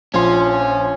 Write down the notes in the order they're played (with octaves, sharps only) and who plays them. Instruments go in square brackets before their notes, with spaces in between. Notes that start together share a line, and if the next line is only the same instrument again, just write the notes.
[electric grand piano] A#1 F3 C6 [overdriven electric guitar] C#4